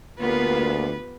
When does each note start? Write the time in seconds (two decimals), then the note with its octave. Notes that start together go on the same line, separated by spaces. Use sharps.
0.20 D2 A#3 B3 F4 G4 B4